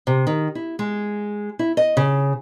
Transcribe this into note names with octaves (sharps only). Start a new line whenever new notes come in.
C3
D#3
E4
G#3
E4
D#5
C#3